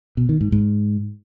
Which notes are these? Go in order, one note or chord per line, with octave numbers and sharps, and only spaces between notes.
B2
D#3
G#2
G#2